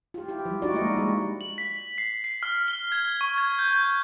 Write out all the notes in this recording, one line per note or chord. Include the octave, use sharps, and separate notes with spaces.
F4 G4
E4 G4
F3 G3
D4 D#4 F4 F#4 D5
G#3 A#3 D#4 E4 D#5
G3 G#3
F#7
B6
C7
C7
F6
G7
G#6
C#6
G#6
G6
G6